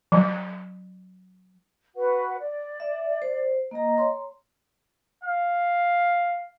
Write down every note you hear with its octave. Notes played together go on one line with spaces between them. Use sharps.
F#3
F#4 B4 F#5
D5
E5
C5
A#3 D#5 A#5
C#5 A#5 C6
F5